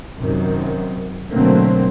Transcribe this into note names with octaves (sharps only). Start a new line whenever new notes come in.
F#2 C3 D#3
B2 D3 F#3 A3 A#3 C4